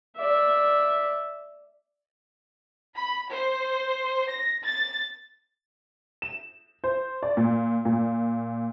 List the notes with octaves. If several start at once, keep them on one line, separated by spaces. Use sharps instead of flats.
D5 E5
B5
C5
A#6
A6
E7
C5
D5
A#2
A#2